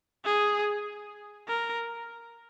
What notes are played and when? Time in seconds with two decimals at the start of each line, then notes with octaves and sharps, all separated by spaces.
0.25 G#4
1.48 A#4